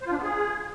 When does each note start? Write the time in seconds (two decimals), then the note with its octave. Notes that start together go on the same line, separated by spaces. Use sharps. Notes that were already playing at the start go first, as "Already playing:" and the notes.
0.01 C5
0.06 F4
0.12 D4
0.18 B3
0.23 G#4